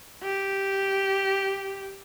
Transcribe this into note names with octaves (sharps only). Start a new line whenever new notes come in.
G4